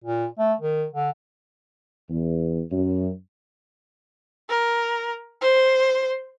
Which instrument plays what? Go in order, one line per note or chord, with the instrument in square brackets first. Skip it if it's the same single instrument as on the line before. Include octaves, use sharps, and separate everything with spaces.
[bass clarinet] A#2
A3
D#3
D3
[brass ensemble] E2
F#2
[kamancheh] A#4
C5